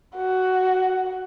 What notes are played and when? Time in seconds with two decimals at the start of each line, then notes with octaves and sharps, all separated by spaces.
0.16 F#4